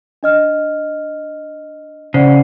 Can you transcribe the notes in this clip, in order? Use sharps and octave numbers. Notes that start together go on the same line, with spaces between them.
D4 D#5 F6
C#3 C5 D5 F#5